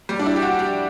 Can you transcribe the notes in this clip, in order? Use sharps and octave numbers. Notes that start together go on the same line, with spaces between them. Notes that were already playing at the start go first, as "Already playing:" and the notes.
G3
D4
E4
G4
F#4
G4